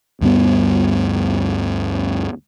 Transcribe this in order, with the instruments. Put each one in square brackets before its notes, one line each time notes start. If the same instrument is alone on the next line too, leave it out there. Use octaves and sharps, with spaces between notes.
[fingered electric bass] D2 G2 G3 B3